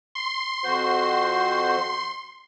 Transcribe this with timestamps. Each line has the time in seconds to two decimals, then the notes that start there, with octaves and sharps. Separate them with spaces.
0.15 C6
0.64 F2 F#4 C5